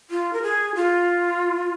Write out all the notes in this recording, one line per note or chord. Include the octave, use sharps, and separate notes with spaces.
F4
A#4
G#4
F4